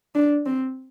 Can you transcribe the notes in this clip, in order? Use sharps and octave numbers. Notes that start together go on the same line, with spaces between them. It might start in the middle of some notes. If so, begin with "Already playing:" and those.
D4
C4